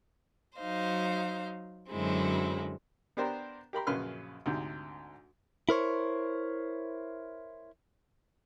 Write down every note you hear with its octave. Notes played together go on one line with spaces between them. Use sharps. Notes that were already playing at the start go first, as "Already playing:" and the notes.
F#3 D#4 C5 F5
F#2 D3 F#3 G#3 C4 E4
B3 D4 G4 A#4 C5
G4 A#4 B5 C6
A#1 F#2 C#3 B4 C6 F6
D2 G#2 C3
E4 A#4 C5 C#5